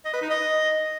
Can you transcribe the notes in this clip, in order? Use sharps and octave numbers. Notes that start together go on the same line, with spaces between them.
D#5
B4
D#4
D#5